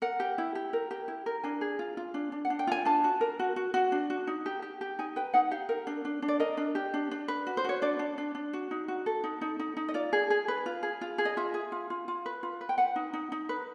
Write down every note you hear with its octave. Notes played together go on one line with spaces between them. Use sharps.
A#4 F#5
G4
E4
G4
A#4
G4
E4
A#4
D4 G#5
G#4
F4
F4
D4
D4
F#5
D4
G5
F4 G#5
D4 A5
F#4
A#4
F#4
F#4
F#4
D4
F#4
D#4
G4
G4
G4
D#4 G#5
B4 G5
D#4 F#5
G4 F5
A#4
D4
D4
D4
D5
A#4 D#5
D4
G4
D4
D4
B4
F#4
C5
F#4 C#5
D4 D5
D4
D4
D4
F#4
D#4
F#4
A4
D#4
D#4
D#4
D#4
D#5
F4 D5
G#4
G#4
B4
F4
G#4
F4
G#4
D#5
F4 E5
G#4
F4
F4
F4
B4
F4
B4
G5
B4 F#5
D#4
D#4
D#4
B4